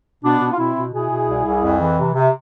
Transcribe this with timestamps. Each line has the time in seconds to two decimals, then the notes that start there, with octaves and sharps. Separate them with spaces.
0.23 B2 B3 D4
0.41 B2
0.52 F4
0.58 B2 C4 E4
0.76 B2
0.93 B2 E4 G#4
1.10 B2
1.28 C2
1.45 C2
1.62 F2
1.80 E3
1.97 C3
2.14 C3